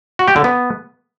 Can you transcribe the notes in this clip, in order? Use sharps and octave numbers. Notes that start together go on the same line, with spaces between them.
F#4
G4
D3
B3